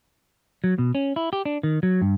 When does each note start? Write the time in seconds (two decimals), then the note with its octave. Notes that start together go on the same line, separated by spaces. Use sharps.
0.64 F#3
0.78 B2
0.95 C#4
1.16 E4
1.33 G4
1.45 D4
1.63 D#3
1.83 F#3
2.02 G2